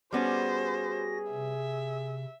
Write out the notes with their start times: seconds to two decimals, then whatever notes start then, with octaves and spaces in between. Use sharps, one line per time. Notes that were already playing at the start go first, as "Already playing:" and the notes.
0.12 G3 B3 C#4 F#4 G#4 C5 A#6
1.31 C3 E5